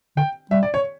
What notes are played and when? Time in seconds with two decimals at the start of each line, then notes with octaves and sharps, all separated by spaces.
0.17 D3 G5
0.51 G3 E5
0.63 D5
0.74 C#5